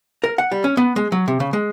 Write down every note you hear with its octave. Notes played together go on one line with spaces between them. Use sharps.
A#4
F#5
G3
C#4
B3
G#3
F#3
C3
C#3
G#3